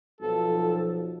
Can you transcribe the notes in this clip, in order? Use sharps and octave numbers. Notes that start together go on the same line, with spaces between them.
B1 F3 A4